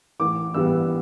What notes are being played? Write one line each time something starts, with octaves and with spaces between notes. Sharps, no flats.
A1 D6
G2 E3 G3 B3 E6